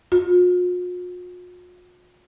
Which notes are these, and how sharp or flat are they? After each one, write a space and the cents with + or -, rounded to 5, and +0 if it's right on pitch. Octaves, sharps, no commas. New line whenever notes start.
F4 +45